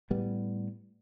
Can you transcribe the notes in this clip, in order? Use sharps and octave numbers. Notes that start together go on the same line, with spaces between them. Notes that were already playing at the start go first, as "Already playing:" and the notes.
A2 G3 B3